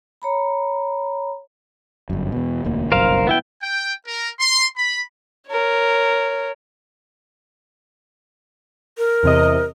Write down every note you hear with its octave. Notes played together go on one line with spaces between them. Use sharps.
C#5 A#5 B5
G1 F#2
E2 B2
E1 D2 A#3
F#1 B1 G2 A#4 C5 F5
B3 E4 G5
G5
A#4
C6
B5
A#4 C#5
A#4
E2 C3 D#5